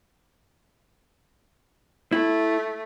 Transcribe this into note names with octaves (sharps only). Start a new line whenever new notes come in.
A3 E4